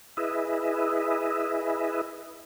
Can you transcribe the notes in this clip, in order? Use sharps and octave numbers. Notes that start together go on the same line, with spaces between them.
E4 G#4 B4 D#5 E5